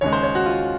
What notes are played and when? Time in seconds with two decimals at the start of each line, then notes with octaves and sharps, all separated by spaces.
0.01 D#2 C#3 G#3 C#5
0.12 C5
0.23 C#5
0.35 F#4
0.46 F4